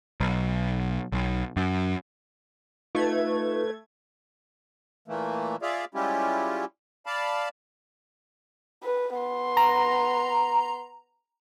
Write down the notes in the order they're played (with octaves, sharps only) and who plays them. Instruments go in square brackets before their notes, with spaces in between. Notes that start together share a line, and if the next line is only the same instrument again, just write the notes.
[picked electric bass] B1
B1
F#2
[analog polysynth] A3 G#6 [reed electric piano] D#4 F4 [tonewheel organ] B4
[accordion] A#2 E3 A3 A#3
F4 G#4 D5 E5 F5
G3 G#3 C#4 E4 F4 G4
D5 F5 A5 B5
[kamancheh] B4
B3 C6
[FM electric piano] A#5